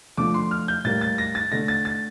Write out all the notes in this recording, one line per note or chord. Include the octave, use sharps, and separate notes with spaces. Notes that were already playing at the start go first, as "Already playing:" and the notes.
D3 F3 A3 D6
C6
F6
G6
A2 G3 A#3 A6
A6
A#6
A6
D3 A3 A#6
A6
A6